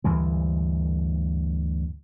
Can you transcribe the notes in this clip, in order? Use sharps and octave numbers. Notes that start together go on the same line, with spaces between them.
D2 G2 E3 G#3